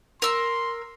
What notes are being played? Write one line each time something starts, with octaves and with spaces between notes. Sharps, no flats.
A#4 C6 E6